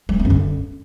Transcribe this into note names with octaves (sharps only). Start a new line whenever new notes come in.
G3
A3
B3
F#2
D3